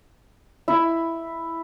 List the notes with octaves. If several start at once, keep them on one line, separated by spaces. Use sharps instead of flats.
E4